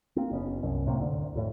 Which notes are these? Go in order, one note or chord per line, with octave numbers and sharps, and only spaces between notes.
A#3 C4
F#1 B3 C#4
C2 F#2
A2 C3 A#3
D2 D3
F2 A2